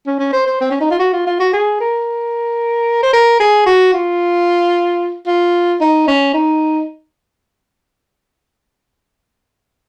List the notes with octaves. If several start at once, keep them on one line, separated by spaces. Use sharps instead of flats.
C#4
C#4
C5
C5
C4
C#4
D#4
F4
F#4
F4
F4
F#4
G#4
A#4
C5
A#4
G#4
F#4
F4
F4
D#4
C#4
D#4